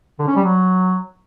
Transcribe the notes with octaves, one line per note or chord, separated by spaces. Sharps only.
D3
C#4
G3
F#3